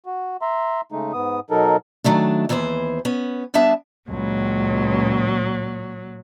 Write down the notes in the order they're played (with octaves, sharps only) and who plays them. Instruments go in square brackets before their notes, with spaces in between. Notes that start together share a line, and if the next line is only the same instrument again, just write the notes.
[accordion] F#4
E5 A#5 C6
C#3 G#3 A3 D#4
G#2 B3 D#6
B2 F#3 D#4 A4 A#4
[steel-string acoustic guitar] D#3 F#3 A3 D4
D#2 E3 B3 G#4 C5
B3 C#4
G3 B3 D4 G#4 E5 A5
[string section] C#2 [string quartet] A#2 F#3